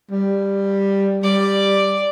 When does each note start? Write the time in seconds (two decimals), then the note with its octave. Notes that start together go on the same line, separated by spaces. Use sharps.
0.11 G3
1.23 G3 D5